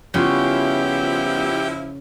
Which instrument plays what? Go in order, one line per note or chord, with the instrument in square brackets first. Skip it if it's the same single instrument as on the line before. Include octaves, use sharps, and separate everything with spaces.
[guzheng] C#3 [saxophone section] F3 E4 [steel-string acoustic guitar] G3 B3 F4 [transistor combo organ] G4